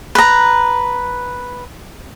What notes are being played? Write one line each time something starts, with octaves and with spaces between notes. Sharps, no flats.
B4 A#5